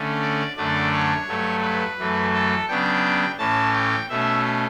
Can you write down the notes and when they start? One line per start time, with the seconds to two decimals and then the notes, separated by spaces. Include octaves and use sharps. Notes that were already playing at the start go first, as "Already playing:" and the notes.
Already playing: D3 A3 C#4
0.22 D5
0.57 F#2 D3 A3 D4 D5
0.92 C#5
1.27 G2 F#3 A3
1.62 B4
1.99 F#2 E3 A3
2.34 A4
2.68 C#3 F#3 B3 D4 G5
3.39 A2 E3 A3 C#4 A5
3.74 G5
4.09 B2 A3 C#4 E5